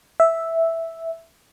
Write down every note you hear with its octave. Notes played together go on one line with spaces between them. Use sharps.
E5